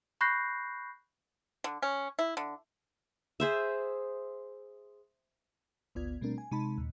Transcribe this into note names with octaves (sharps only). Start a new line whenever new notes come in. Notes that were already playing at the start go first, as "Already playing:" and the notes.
B5 C#6 F#6 G6 A#6 C7
D3
C#4
E4
D3
G#4 C5 E5
G#1 D2 B3 F4 D5 G#6
B2 G3 A3 C4 D4 A#4
G#5
C3 G#3 D#4 A5 B5
D#2 A#2